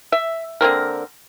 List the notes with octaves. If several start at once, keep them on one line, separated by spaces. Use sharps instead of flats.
E5
D3 A#3 C4 A#4